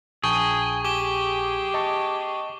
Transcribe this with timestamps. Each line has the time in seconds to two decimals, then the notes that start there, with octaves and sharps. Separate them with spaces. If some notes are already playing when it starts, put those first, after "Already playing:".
0.24 A#1 G#4 G5 A5 C#6
0.85 G4 D6 G7
1.74 D#5 A5 C#6